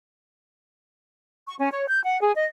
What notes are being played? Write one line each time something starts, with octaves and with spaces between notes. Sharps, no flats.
C#6
C#4
C#5
G6
F#5
G#4
D#5